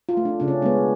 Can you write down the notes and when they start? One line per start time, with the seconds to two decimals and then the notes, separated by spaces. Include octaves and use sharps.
0.09 F4
0.17 A3
0.25 D4
0.40 C#3 D4
0.48 C#4
0.62 G#3 B3 C#4